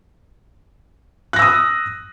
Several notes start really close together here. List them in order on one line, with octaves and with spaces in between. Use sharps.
F#6 A#6 E6 D#6